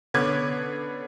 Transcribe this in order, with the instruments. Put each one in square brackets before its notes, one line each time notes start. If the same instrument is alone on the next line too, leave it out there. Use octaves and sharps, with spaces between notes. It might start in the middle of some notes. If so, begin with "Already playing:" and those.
[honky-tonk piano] D3 B3 C#4 B4 D6 G#6